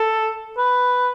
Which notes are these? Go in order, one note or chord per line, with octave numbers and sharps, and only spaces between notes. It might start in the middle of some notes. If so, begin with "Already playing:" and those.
Already playing: A4
B4